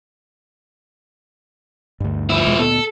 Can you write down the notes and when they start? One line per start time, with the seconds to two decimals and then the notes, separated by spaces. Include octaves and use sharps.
2.00 D2 G2
2.30 F3 E4
2.46 E2 B2 G#3
2.59 D2 A#2 B3 A4